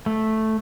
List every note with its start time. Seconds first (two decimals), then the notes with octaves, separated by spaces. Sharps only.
0.06 A3